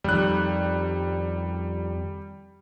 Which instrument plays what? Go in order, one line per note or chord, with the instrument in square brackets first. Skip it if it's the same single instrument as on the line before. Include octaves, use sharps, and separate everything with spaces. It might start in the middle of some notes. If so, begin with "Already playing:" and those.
[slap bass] F2 D#3 [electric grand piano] G3 F#6